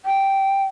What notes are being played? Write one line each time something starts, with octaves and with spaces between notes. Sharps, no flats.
G5